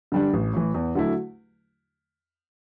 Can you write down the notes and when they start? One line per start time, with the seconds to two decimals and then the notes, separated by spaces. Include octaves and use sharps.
0.12 D3 G3 D4
0.33 A1
0.53 A2 E3
0.75 E2
0.95 D3 F#3 A3 E4